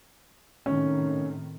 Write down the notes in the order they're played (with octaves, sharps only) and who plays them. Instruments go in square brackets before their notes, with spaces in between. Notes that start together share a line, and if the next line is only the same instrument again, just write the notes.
[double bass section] A2 C3 D#3 [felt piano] C#4